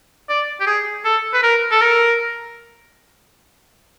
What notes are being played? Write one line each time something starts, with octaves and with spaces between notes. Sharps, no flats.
D5
G4
G#4
A4
B4
A#4
A4
A#4